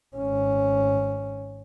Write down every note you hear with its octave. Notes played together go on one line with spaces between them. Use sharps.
G#1 C#4